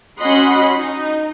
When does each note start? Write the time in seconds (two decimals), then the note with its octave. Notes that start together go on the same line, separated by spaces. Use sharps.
0.20 C#4 F#4 D#5 F#5 B5 C6
0.75 D#4